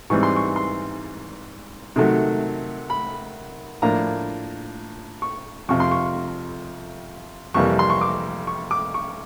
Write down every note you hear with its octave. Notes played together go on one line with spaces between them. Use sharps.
G#2 E3 G3 C4 C#6
C6
C#6
C6
C3 D#3 F#3 A3
B5
A2 F3 A#3 D4 A#5
C#6
F2 C3 F3 C#6
C6
C#6
F2 C3 E3 G3 A#3 C#6
C6
C#6
D6
C#6
D6
C#6